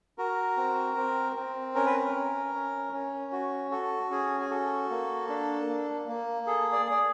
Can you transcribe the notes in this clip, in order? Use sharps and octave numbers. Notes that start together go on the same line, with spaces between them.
F#4 A#4
C4
C4
C4
C#4 A#4
B4
A#4
C#4
C#4
C#4
F#4
F#4 A4
C#4 G#4
G#4
F#4 A4
A#3
D4
A#3
A#3
G#4 A4
D5
G#4
D5